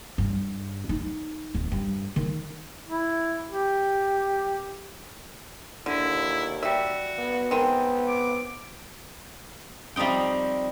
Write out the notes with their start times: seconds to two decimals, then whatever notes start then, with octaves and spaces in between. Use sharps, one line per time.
0.18 G2
0.89 D#4
1.54 D1
1.72 G2
2.16 D#3
2.88 E4
3.51 G4
5.86 D#2 D3 E4
6.63 G3 F#4 E5
7.19 B3
7.51 D#3 G#3 C4
8.08 D6
9.96 F3 G3 C4 D#4 G5